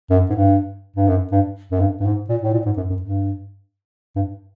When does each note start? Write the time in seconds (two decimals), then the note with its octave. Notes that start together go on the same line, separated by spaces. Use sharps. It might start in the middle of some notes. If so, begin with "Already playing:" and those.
0.10 F#2
0.30 G#2
0.35 G2
0.96 G2
1.08 F#2
1.32 G2
1.71 F#2
1.80 G2
2.00 G2
2.05 G#2
2.29 A#2
2.43 A2
2.53 A#2
2.66 G#2
2.77 F#2
2.90 F#2
3.02 G2
4.16 G2